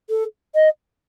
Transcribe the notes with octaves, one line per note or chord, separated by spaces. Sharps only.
A4
D#5